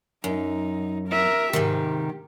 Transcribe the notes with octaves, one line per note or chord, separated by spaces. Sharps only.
F#2 D#4
A#4 E5
G#2 C3 D#3 G4